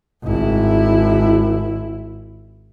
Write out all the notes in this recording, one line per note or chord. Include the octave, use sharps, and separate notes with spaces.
G#1 E4